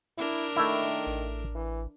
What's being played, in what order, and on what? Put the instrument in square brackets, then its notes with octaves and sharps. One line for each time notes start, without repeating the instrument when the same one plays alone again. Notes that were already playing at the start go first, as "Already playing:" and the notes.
[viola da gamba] D4 A#4 [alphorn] E4
[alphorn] D#3 [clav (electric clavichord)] A3 E4
[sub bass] A1
[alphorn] E3